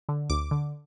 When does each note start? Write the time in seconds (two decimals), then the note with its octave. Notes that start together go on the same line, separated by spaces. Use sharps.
0.09 D3
0.30 D2 D6
0.51 D3